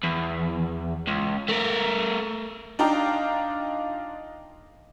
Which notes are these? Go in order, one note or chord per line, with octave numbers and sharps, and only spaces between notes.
E2
C#2
A3 A#4
D4 D#4 F4 F5 G5 A#5